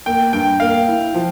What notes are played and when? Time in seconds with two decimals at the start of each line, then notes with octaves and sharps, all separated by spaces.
0.06 A#3 G5
0.33 G2 G5
0.60 A#3 F5
0.88 E4
1.14 F3